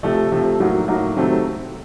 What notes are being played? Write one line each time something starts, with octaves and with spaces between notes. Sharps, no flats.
C3 F3 A3
C3 F3 A3
A2 F#3 A#3 D#4 F#4
A2 F#3 A#3 D#4 F#4
C3 D#3 F#3 A3 C4